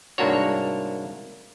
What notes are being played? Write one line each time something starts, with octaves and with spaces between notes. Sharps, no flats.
C2 G#2 A#3 D4 F#4 C#5